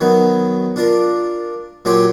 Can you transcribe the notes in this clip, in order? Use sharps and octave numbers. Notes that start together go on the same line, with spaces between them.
D#3 F#3 B3
D4 F4 A#4
A#2 F#3 C#4 G4 G5 C6